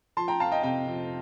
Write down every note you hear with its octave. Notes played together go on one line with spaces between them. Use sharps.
F3 A5 C6
G5 A#5
F2 F5 A5
D#5 G5
C3 D#5 G5
F2